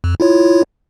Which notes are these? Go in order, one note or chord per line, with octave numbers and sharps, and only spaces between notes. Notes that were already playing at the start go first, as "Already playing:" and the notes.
F2
E4 F4 C#5